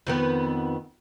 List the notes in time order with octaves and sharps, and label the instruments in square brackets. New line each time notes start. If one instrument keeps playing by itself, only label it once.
[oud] F2 D#3 B3